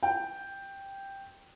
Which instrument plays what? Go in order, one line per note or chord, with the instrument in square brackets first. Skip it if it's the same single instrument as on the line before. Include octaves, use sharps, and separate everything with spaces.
[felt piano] G5